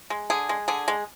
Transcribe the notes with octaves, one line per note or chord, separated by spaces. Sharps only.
G#3
D3 G#4
G#3
D3 G#4
G#3